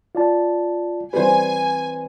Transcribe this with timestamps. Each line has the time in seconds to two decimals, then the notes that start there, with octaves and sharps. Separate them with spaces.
0.15 F4 D5 A5
1.13 E3 G3 C4 B4 C5 G#5